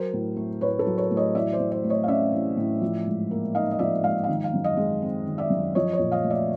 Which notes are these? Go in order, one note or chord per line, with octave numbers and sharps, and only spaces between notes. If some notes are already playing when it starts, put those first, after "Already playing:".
Already playing: F#3 A#4 C5
A2
A3
A2 B4 C#5
A4 B4
F#3
B4 C#5
A2
C#5 D#5
E3 D5 E5
C5 D5
A2
C5 D5
A3
C#5 D#5
F5
C#4 D5 E5
E3
A2
F3
G#2
A#3
D#4 D#5 F5
D#5
F3 D5 E5
G#2 F5
D#3 F5
F5
F#2
D#5 F5
G#3
C4
D#3
D5 E5
F#2
F3 C#5 D#5
C#5 D#5
A#2
D#5 F5
A3
D5 E5